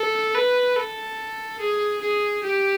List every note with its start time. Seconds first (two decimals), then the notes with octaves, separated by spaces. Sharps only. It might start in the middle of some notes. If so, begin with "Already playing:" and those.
Already playing: A4
0.35 B4
0.77 A4
1.60 G#4
2.02 G#4
2.44 G4